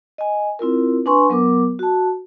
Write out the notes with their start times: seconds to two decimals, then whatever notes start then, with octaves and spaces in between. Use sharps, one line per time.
0.18 D#5 G#5
0.59 C4 E4 F4 A#4
1.06 D4 B4 G#5 C6 C#6
1.30 F#3 B3 A#4 D6
1.79 F#4 A5